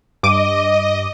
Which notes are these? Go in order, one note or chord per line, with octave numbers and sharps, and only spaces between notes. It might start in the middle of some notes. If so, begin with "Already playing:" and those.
G2 D#5 D6 D#7